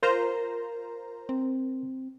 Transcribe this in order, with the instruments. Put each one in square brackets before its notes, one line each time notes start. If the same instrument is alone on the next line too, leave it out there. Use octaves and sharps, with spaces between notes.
[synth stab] F4 C5 A#5 [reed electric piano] A#4
[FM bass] C4